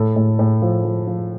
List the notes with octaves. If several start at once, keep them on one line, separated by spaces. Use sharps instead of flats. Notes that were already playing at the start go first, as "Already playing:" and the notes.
Already playing: A2 A4
A2
A2
F3
F3
F3